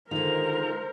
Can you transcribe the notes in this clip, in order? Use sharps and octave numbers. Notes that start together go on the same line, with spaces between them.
D3 D#3 G#3 D#4 F4 A#4 C5 F7